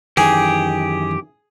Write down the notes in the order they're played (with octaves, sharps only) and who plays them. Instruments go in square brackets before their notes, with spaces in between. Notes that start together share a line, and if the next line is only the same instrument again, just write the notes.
[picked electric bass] F#2 D#3 E3 [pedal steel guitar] G4 [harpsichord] G#4